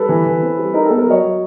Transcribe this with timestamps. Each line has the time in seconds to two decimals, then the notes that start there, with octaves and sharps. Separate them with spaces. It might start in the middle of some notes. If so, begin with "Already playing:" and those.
Already playing: G3 A4 B4
0.09 E3
0.26 E3
0.42 C4
0.58 G3
0.73 D#4 A#4
0.86 B3 A4
0.99 A#4
1.07 F#3 C#5 D#5
1.22 F#3